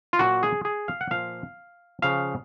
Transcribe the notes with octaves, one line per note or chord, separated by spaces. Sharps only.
F4
A#2 F#3 F#4
G#4
G#4
F5
F#5
A#2 F3 F5
C#3 F3 F5